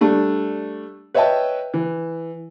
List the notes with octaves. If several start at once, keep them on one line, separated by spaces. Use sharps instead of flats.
G3 A3 D4
B4 C#5 D#5 E5 G5 A5
E3